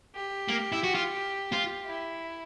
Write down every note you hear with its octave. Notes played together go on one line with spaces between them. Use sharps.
G4
A#3
E4
F#4
F4
F4
E4